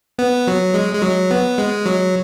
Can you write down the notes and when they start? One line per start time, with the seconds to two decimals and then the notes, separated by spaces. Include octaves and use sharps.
0.19 B3
0.47 F#3
0.74 G#3
0.95 G#3
1.02 F#3
1.31 B3
1.58 G#3
1.86 F#3